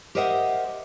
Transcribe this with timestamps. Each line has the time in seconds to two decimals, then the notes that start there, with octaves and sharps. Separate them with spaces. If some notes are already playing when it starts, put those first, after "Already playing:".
0.15 G4 A#4 C5 D#5 E5 F#5